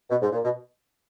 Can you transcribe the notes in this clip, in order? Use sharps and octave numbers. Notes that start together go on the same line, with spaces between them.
B2
G#2
A#2
B2